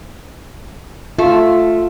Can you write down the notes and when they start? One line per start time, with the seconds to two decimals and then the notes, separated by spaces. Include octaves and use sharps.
1.19 A3 F4